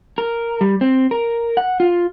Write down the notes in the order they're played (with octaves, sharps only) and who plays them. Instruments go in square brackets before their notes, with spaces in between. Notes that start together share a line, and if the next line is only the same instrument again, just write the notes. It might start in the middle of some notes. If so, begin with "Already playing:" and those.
[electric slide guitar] A#4
G3
C4
A#4
F#5
F4